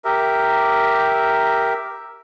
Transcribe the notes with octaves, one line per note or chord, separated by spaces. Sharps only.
G4 A#4 E5